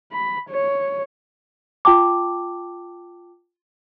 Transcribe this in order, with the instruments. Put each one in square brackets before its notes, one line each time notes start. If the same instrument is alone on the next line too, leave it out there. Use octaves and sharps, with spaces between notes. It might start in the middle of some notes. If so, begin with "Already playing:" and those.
[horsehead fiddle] B5
C#5
[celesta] F4 G5 A5 D6